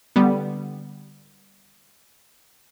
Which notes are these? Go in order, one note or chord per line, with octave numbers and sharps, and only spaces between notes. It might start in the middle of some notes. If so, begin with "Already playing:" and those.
D3 G3 B3